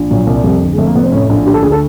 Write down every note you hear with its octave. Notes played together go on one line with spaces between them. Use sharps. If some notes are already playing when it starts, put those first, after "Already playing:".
Already playing: A#1
A#2 F#3
C2
F2 G3
G1
G#3
F2 A3
A#3
F1 B3
C4
A2 C#4
A#1
D3 G4
A4
D2 G#4
A4